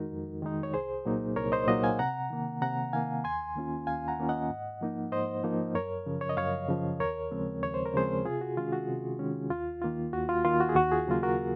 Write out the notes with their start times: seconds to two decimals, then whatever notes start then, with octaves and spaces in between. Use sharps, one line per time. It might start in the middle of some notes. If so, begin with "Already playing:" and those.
Already playing: F2 D#3 G#3 D#4 F#4 A#4
0.12 F2
0.42 D#3 G#3 D#4
0.63 C#5
0.74 C2 G#4 C5
1.05 A#2 F#3 A#3 D#4
1.36 C2 A#4 C#5
1.52 C5 D#5
1.68 A#2 F#3 A#3 D#4 D#5 F#5
1.83 F5 G#5
1.99 C3 F#5 A#5
2.30 D#3 A#3
2.62 C3 F#5 A#5
2.93 D#3 A#3 F5 G#5
3.24 D#2 G#5 C6
3.55 D#3 A#3 C#4 F4
3.87 D#2 F5 G#5
4.08 F#5 A#5
4.19 D#3 A#3 C#4 F4
4.29 D#5 F#5
4.50 G#2
4.81 F3 A#3 D#4
5.12 G#2 C5 D#5
5.44 F3 A#3 D#4
5.75 F#2 A#4 C#5
6.06 C#3 F3
6.21 C#5
6.29 D#5
6.37 F#2 C#5 F5
6.69 C#3 F3
7.00 D#2 A#4 C#5
7.31 C#3 F3 G#3 C4
7.63 D#2 C#5
7.74 C5
7.85 A#4
7.94 C#3 F3 G#3 C4 G#4 C5
8.25 C3 F4 G#4
8.41 F#4
8.57 D#3 G#3 C#4 F4
8.72 F#4
8.88 C3
9.19 D#3 G#3 C#4
9.50 D#2 F4
9.82 D#3 A#3 F4
10.13 D#2 F#4
10.29 F4
10.44 D#3 A#3 F4
10.60 F#4
10.69 G#4
10.76 D#2 F#4
10.92 F4 G#4
11.08 C#3 F#3 A#3 F4
11.23 F#4 A#4